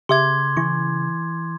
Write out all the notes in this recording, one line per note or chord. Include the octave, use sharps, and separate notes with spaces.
C#3 G4 E5 C6 D6 G#6
E3 E4 C#6